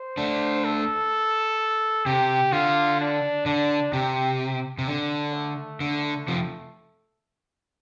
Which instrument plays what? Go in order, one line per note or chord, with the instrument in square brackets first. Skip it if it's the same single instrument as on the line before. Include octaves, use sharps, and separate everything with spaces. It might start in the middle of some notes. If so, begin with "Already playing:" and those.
Already playing: [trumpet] C5
[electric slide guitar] A3 D4
[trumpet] A4
[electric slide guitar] C3 [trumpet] G4
[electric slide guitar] D3 [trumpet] F4
[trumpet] D4
[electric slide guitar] D3 [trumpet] D4
[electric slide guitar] C3 [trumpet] G4
[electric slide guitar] C3
[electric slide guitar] D3 [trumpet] D4
[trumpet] A3
[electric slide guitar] D3 [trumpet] A3
[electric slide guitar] C3 F3